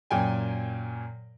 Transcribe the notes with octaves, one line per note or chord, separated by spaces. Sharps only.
F#2 A#2 G5 G#5